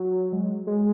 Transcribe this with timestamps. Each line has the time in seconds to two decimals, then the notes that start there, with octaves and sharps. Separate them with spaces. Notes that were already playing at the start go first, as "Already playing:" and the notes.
Already playing: F#3
0.32 G#3
0.67 G#3